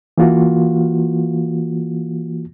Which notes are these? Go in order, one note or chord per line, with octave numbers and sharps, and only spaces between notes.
E3 A#3 F4 F#4